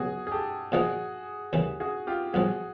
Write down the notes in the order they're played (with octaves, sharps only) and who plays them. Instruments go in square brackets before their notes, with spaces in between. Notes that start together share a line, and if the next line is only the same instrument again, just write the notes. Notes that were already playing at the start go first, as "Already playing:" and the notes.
Already playing: [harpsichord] C#2 B2 F#3 [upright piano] F#4 G#4
[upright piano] G#4
G4 A4
[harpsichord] A#2 F3 A#3 D#4 [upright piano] F#4 G#4
[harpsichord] D#2 C#3 E3
[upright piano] F#4 G#4
F4 G4
[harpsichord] B1 A2 F3 [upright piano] F#4 G#4